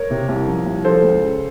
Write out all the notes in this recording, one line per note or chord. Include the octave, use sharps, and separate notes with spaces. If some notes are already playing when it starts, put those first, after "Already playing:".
Already playing: A#4 C#5
C3
C2
F3
C2
F3 A4 C5
C#2
C#3